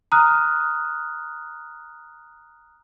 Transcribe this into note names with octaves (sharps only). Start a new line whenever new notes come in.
A#5 D#6 F6 F#6